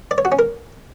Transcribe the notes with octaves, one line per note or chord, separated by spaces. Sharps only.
D5
C#5
F#4
C#4
A#4